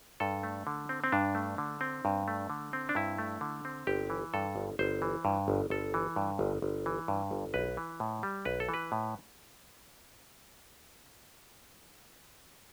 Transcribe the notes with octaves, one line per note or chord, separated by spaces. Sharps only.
G2 A4
A3
D3
C4
C4
G2 D4
A3
D3
C4
G2
A3
D3
C4
D4
G2 E4
A3
D3
C4
G1 G4
E3
G2 A4
G1
G1 C5
E3
G2
G1
G1 A4
E3
G2
G1
G1
E3
G2
G1
B1 B4
E3
A2
G3
B1 B4
A4
E3 B4
A2